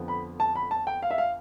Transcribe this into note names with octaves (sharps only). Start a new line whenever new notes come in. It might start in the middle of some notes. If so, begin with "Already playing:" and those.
Already playing: F2 D3 F3 B3
B5
A5
B5
A5
G5
F5
E5
F5